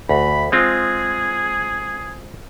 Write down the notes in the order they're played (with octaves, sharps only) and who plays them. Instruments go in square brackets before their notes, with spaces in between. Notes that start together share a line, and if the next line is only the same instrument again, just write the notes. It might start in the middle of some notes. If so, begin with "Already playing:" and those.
[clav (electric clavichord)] D2 [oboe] B5
[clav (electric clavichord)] G#3 C4 F4 [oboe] G#4